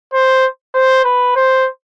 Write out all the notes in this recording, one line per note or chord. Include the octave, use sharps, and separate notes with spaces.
C5
C5
B4
C5